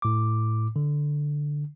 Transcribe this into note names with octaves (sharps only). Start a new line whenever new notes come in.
A2 D6
D3